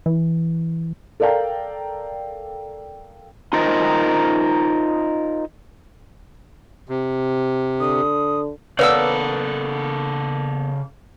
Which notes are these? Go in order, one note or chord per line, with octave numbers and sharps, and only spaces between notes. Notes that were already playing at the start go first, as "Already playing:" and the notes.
E3
A4 A#4 D5 F5 G5 A#5
D#4 F4 A#4 C5 D#5
C3
D3 D#6
C#3 A#3 B3 A4 B4 C#5 D5 E6